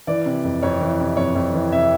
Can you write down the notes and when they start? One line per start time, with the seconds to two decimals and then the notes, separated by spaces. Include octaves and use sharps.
0.07 E3 D5
0.26 C3
0.44 F2
0.63 F2 C#5
0.81 E3
1.00 C3
1.17 F2 C#5
1.35 F2
1.54 E3
1.72 C3 E5